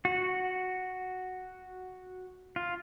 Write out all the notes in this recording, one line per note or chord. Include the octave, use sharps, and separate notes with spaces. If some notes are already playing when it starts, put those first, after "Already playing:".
F#4
F4